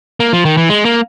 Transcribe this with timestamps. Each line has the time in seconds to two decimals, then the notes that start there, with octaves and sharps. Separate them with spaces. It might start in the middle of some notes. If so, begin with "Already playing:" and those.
0.20 A#3
0.33 F3
0.45 D#3
0.57 E3
0.69 G#3
0.85 A#3